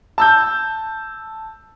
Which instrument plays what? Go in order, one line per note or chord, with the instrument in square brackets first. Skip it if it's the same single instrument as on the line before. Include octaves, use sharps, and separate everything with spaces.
[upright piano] A5 E6 G6